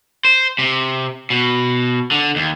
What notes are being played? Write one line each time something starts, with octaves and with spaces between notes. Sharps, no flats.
C5
C3
B2
D3
D#2